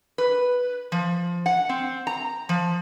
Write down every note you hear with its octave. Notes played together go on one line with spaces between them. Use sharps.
B4
F3
F#5
C4
A#5
F3